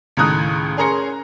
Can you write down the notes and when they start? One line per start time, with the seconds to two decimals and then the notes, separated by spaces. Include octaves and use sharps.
0.17 C#2 A2 D#3 A#5 D#6 F#6
0.77 C#4 G#4 A#4 A#5 C6 C#7